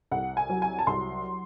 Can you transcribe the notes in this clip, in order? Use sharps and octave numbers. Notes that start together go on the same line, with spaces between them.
C2 F#5
G#5
F#3
G#5
A5
C2 C6